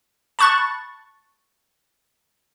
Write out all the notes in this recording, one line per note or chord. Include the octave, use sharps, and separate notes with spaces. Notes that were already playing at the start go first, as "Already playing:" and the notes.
A5 B5 C#6 F#6 A6